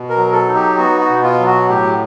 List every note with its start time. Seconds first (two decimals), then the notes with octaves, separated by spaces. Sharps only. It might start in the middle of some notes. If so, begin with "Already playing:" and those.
Already playing: B2
0.09 A#4
0.17 F#3
0.32 A4
0.48 D#4
0.55 G4
0.78 B3 F#4
1.01 F#4
1.09 B2
1.23 F4
1.39 F#3
1.46 F#4
1.69 A2 G4